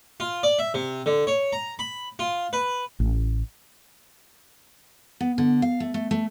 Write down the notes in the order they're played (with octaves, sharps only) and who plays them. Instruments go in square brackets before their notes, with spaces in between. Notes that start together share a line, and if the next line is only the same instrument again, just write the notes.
[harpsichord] F4
D5
E5
C3
D3
C#5
A#5
B5
F4
B4
[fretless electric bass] A1
[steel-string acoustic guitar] B3
D3
F5
A3
A3
A3